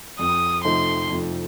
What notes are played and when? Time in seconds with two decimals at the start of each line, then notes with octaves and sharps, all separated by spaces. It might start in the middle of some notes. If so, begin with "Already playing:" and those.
0.19 F2 D#6
0.64 C3 F3 A3 D#4 C6
1.10 F2